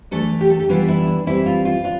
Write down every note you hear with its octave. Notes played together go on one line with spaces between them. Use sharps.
E3 A3 D4 A4
G4
A4
G4
E3 G3 B3 D4 F4
E4
D4
E3 G3 C4 E4
F4
F4
D4 F4